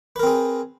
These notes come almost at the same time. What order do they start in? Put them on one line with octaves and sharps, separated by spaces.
B4 A#4 C4 G#4